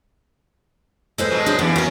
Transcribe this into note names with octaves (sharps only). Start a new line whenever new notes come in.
G#3 A4 B4 C5
B2 F#3 G#3
D4 G#4 C5
C#3 E3 B3
B3 C#4 F#4 A#4